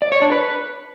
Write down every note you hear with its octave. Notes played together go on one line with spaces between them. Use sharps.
D5
C#5
D4
B4